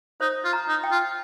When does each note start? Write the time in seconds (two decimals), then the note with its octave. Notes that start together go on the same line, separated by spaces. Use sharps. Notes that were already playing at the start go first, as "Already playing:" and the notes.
0.21 D#4 C5
0.44 F4
0.53 A#5
0.68 D#4
0.84 G5
0.91 F4